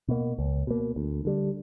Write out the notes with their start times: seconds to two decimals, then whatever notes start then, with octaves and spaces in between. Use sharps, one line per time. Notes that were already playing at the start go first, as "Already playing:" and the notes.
0.08 B2 A#3
0.39 C#2
0.67 B2 A#3
0.96 D2
1.25 D3 G3